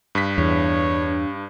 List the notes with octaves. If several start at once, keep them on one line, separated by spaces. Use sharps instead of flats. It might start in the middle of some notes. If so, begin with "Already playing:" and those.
G2 B6
E2 D4 C#5